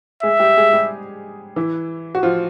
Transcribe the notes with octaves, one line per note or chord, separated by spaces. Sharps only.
G#3 G#4 E5
G3 G4
G#3 G#4
G3 G4
E3 E4
F#4
F3 F4